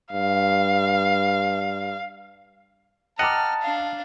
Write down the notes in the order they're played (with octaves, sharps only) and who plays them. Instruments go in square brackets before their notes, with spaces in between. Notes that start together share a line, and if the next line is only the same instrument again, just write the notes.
[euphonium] G2 [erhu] F5
[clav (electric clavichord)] D#5 F#5 [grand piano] G5 A#5 D6 [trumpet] A5 [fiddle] F6
[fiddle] D4 F5